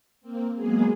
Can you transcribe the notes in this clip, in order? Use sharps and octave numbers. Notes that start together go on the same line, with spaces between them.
A#3 C4
F#3 G#3 A#3 B3 G#4